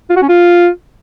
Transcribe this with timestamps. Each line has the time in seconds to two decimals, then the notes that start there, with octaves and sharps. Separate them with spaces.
0.10 F4
0.16 F#4
0.22 C#4
0.29 F4